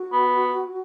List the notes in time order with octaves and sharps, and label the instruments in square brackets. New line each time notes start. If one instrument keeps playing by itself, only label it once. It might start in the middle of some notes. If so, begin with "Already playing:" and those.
Already playing: [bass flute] F#4
[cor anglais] B3